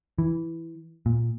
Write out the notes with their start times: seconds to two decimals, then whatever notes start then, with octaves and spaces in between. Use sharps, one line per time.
0.18 E3
1.06 A#2